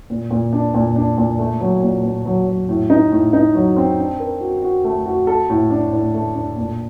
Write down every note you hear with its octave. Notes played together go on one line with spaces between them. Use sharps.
A#2
A#2
D4
A#2
D4
A#2
A3
F#3
A#2
A#2
F#3
F#3
A2
D#4
A2
D#4
F#3
C4
D4
A#4
F#4
F#4
A3
F#4
A4
A2
D4
A2
A3
D4
A#2